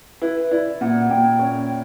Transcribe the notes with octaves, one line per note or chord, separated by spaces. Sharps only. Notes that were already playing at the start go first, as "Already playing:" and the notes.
E4 B4
E4 D5
A#2 F#5
A#2 G5
C#4